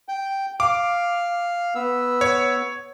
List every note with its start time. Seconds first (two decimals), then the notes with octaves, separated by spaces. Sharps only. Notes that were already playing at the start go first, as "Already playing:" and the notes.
0.08 G5
0.60 F5 D6
1.75 B3 E6
2.21 C#5